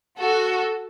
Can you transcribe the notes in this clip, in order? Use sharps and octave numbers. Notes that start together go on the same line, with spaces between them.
F#4 A4